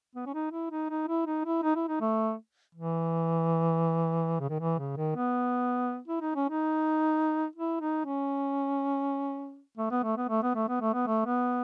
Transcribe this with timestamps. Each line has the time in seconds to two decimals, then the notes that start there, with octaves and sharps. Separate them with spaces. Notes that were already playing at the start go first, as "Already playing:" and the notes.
0.15 B3
0.26 C#4
0.34 D#4
0.52 E4
0.71 D#4
0.90 D#4
1.08 E4
1.26 D#4
1.45 E4
1.63 D#4
1.76 E4
1.88 D#4
2.01 A3
2.75 E3
4.40 C#3
4.50 D#3
4.60 E3
4.79 C#3
4.97 D#3
5.16 B3
6.08 E4
6.21 D#4
6.35 C#4
6.49 D#4
7.55 E4
7.81 D#4
8.05 C#4
9.78 A3
9.91 B3
10.04 A3
10.17 B3
10.29 A3
10.43 B3
10.55 A3
10.68 B3
10.81 A3
10.93 B3
11.07 A3
11.26 B3